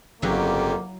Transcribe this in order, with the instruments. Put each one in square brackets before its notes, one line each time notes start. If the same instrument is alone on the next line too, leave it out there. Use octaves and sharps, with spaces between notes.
[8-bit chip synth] G1 C#3 G4 [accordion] F2 [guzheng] F#3 E4 [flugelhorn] A#3